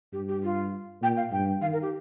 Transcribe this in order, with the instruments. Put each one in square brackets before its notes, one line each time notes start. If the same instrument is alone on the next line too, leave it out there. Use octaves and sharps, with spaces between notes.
[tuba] G2 [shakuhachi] G4
[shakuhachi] G4
F4
[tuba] A#2 [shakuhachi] G5
[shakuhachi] F5
[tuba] G2 [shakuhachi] G5
[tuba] D#3 [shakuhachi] F5
[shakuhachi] A#4
G4